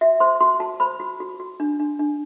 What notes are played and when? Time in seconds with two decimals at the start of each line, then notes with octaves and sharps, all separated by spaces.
0.01 F#4 E5
0.20 C5 C6
0.41 F#4 C6
0.60 F#4 A5
0.80 C5 B5
1.00 F#4
1.20 F#4
1.40 F#4
1.60 D4
1.80 D4
1.99 D4